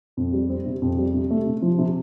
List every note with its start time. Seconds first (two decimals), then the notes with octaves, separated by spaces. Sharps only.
0.17 F2
0.33 G3
0.49 C4
0.66 C3
0.82 F2
0.98 G3
1.14 C3
1.31 A3
1.46 C3
1.62 F3
1.79 C3